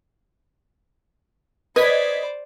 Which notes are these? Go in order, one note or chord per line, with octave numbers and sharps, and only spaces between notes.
B4 C5 D5 D#5 G#6 B6